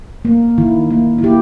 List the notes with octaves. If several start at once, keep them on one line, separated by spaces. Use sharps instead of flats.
A#3
D#3 E4
A#3
E4
A#3 G4